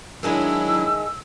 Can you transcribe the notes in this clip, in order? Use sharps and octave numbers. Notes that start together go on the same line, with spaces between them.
D#3 F#3 G#3 A3 D4 E4 E6